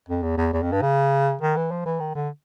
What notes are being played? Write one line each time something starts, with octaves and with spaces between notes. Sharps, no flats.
F2
E2
E2
E2
F2
G2
C#3
D#3
E3
F3
E3
D#3
D3